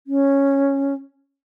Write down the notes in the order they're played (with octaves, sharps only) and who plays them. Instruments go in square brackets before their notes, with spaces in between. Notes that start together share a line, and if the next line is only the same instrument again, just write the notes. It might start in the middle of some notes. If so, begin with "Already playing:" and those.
[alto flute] C#4